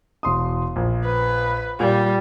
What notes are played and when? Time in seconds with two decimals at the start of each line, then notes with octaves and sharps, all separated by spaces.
0.23 E1 C6 D#6
0.76 A#1
1.05 B4
1.80 A#2 G3